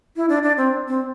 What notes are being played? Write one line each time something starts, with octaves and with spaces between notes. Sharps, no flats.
E4
D4
D4
C4
C4